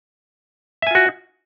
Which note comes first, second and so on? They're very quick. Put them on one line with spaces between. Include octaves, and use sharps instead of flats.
E5 G#5 F4 F#4